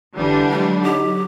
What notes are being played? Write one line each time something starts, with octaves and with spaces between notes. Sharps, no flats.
F1 D3 E3 G3 D4
F#3 G#3
D#4 G4